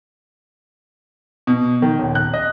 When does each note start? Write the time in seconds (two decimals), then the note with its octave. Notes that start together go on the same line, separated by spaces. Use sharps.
1.47 B2
1.82 D#3
1.98 D#1
2.15 F#6
2.34 D#5